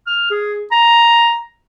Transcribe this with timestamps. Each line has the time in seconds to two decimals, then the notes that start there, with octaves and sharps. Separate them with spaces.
0.07 F6
0.30 G#4
0.71 A#5